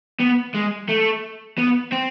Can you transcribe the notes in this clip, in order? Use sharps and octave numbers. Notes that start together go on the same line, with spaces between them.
B3
G#3
A3
B3
C4